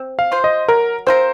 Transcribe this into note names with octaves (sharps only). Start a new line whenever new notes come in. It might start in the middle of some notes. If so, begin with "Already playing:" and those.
Already playing: C4
F5
F4 C5
D#5
F#3 A#4
C4 F4 A#4 C5